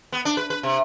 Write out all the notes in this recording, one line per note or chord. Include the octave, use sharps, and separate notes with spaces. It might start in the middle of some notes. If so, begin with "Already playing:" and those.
B3
D4
B4
B4
C3